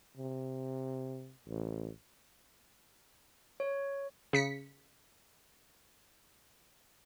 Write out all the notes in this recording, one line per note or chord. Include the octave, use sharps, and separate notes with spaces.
C3
A1
C#5
C#3 B6 C#7